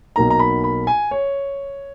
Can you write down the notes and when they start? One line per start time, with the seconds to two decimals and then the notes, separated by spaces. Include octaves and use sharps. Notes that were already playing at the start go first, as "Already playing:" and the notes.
0.16 B1 B2 A#3 D#4 A#5
0.30 A#5
0.39 B5
0.64 B5
0.87 G#5
1.11 C#5